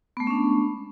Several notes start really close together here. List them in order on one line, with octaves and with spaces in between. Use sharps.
B3 A3 G#3 C#4 D4